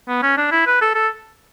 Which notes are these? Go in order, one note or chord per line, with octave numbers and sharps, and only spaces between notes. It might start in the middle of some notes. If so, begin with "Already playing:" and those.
B3
C#4
D4
E4
B4
A4
A4